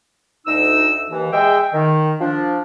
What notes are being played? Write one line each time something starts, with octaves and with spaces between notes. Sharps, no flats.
D2 D#4 E6
D#2 E3
G#3 E5 G5
D#3
F3 D4